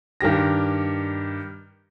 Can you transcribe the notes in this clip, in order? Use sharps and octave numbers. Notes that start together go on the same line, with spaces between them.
G2 D#3 G4 A#6